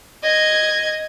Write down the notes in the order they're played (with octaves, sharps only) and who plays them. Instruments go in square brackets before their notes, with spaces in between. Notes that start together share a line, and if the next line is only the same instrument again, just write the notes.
[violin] D#5 G#6